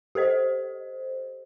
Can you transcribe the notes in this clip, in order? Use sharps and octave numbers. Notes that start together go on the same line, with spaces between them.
G4 A4 C5 D#5